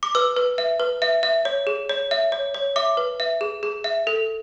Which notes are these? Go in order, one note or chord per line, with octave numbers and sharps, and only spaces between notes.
D6
B4 E6
B4
E5
B4
E5
E5
C#5
G#4
C#5
E5
C#5
C#5
E5 D6
B4
E5
G#4
G#4
E5
A4